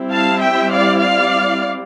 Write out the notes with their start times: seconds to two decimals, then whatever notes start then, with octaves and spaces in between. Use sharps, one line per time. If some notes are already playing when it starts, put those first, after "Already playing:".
Already playing: G3 C4 E4
0.12 F5 A5
0.42 E5 G5
0.72 D5 F5
1.02 D5 F5